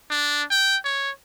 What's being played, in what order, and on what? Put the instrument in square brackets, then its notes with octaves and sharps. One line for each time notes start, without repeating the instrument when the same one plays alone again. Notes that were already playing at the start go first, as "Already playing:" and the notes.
[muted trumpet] D4
G5
C#5